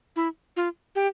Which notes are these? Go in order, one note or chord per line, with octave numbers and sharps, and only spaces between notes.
E4
F4
G4